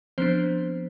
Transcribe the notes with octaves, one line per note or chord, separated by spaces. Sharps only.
F3 B3 C4 D4 C5